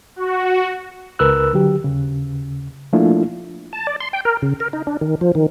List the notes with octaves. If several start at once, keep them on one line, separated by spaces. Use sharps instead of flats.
F#4
C#2 A#4 B4 E6 F#6
D3 F#3 G4
D#2 C#3
F3 A3 A#3 D4 E4 F4
A5
D5
C6
G5
A#4
C#3
A#4
D#4
D4
D#3
F3
D#3